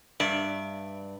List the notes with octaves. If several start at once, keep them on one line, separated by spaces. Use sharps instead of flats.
G2 D5 E5